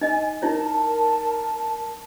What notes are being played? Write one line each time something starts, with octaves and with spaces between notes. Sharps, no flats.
D#4 D#5 G#5
D#4 E4 A#4 C#5 A5